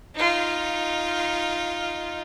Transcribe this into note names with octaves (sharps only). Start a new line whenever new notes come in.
D#4 F4